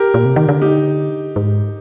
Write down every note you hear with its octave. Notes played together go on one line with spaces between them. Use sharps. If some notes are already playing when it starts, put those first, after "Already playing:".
Already playing: G4 A#4
A#2
C3
D#3
D3
D#4 G4
G#2